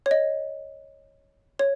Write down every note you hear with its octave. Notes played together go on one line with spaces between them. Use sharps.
C#5
D#5
C#5